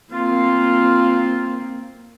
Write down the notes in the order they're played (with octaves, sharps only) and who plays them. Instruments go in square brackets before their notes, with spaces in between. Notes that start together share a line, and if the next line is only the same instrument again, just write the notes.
[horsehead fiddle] A#3 C4 [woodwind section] F4